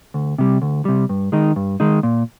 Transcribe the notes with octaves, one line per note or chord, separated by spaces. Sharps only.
D2
C3 G3
D2
C3 G3
G2
D#3 G#3 D#4
G2
D#3 G#3 D#4
A#2